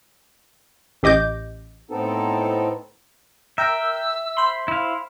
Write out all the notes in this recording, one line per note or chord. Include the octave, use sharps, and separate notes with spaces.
A1 G4 D#5 D6 G6
A2 B3 C4 D#4 A4
A#4 E5 G5 E6 G6
C5 B5 C6
E4 F5